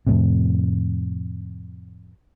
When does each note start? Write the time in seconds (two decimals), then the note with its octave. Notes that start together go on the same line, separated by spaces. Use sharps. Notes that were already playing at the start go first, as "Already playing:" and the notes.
0.07 F2 A2 C3